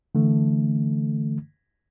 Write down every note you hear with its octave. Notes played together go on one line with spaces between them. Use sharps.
D3 E3 A3